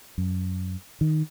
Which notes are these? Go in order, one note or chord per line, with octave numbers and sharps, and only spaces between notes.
F#2
D#3